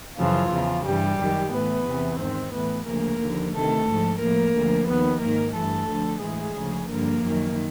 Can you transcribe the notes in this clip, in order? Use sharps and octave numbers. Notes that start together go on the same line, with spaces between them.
F#2 C#3 E3 F3 F4
E2 C#3 F3
G2 E3 G3 G4
F#2 D#3
A2 E3 B3 B4
E2 C3 E3
G#2 D#3 C4 C5
A2 E3 B3 B4
D2 C#3 F3 A#3 A#4
D#2 D3 F3
D2 C3 D#3 A3 A4
G#2 F3
A2 F3 A#3 A#4
D2 D3 F3
D#2 D#3 B3 B4
G#2 D#3 A#3 A#4
G2 E3 A3 A4
D2 D3 F3
A2 E3 G#3 G#4
D2 C#3 F3
G2 D3 F3 A#3 A#4
F#2 D#3